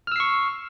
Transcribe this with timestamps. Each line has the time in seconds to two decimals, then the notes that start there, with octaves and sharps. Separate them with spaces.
0.07 F6
0.12 E6
0.16 C7
0.20 C#6